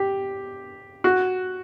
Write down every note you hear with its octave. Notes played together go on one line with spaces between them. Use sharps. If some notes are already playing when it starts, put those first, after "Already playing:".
Already playing: G4
F#4